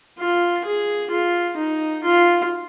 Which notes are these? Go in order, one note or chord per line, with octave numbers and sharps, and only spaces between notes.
F4
G#4
F4
D#4
F4